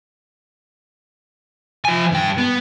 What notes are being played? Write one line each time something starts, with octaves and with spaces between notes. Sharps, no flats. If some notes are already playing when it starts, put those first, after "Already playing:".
F3 G#5
G2 G5
B3